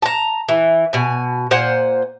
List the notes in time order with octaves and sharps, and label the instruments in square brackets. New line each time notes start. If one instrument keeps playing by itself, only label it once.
[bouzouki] A5 A#5
E3
B2 G#5
A#2 C5 F#5 G#5